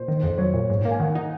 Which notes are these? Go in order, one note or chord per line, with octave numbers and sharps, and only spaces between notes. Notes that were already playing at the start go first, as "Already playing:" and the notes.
Already playing: A#2 C5
D#3
F2
F#3 C#5
A#2
G#2
A#3
G#5
D#3 F#5
D#4